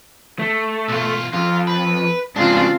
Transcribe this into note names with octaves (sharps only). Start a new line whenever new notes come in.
A3
B1 F4
F2 F4
B4
G#2 C#3 C4 D4 F4